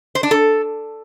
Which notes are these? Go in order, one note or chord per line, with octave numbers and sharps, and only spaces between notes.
C5
D4
A4